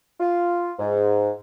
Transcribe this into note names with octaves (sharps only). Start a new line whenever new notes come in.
F4
G#2